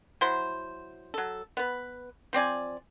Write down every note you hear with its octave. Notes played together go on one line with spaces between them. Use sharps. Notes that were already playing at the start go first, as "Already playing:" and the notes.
F#3 E4 C5 C6
F#3 A4
B3 B4
F3 C4 D5 G#5